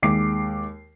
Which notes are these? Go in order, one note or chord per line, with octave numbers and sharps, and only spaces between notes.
D#2 G#3 D6 C7